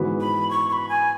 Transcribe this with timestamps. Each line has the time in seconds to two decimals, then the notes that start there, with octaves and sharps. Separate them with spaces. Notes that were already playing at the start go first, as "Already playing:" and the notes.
Already playing: G#2 E3 B3 F#4 B4
0.21 B5
0.50 C#6
0.69 C#6
0.73 B5
0.89 G#5